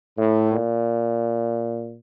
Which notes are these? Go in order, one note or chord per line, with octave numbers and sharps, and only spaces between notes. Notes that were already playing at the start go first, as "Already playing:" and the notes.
A2
A#2